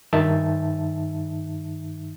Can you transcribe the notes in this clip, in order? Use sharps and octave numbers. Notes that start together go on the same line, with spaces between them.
G2 D#3 D#4 E5 A5